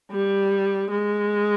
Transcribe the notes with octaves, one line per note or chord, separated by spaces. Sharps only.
G3
G#3